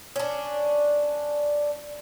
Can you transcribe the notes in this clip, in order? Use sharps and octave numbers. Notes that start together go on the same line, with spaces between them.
C#4 D4